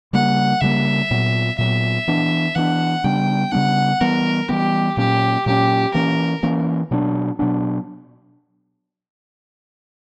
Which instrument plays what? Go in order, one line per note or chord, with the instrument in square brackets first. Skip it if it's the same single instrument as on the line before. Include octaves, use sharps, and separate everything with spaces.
[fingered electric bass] C#3 G3 A#3 [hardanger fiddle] F#5
[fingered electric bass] C#3 G3 A#3 [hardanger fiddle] E5
[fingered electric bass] A#2 F#3 B3
[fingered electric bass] A#2 F#3 B3 [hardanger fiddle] E5
[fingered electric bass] E3 B3 D4
[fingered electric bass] E3 B3 D4 [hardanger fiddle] F#5
[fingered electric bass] C#3 G3 B3 D4 [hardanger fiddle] G5
[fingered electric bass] C#3 G3 B3 D4 [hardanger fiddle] F#5
[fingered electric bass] E3 G3 B3 [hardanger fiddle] A#4
[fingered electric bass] E3 G3 B3 [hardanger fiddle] G4
[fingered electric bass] A#2 F#3 A#3 C#4 [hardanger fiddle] G4
[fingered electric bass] A#2 F#3 A#3 C#4 [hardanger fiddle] G4
[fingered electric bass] E3 A#3 C#4 [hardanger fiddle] A#4
[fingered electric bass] E3 A#3 C#4
B2 F#3 B3 D4
B2 F#3 B3 D4